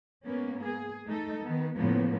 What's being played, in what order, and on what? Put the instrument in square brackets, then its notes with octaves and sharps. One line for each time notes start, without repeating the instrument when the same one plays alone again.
[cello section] G#2 A#3 B3 C#4
G#4
A3 D#4 A4
D#3 B3
A2 C#3 F3 A#3 B3